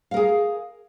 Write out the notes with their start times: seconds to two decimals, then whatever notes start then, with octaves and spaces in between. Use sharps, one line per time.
0.11 F5
0.14 A#4
0.16 G#4